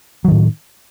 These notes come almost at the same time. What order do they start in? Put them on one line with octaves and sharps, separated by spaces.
F#3 D#3 A2